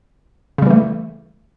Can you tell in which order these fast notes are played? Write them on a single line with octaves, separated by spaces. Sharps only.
C#3 G3 E3 A3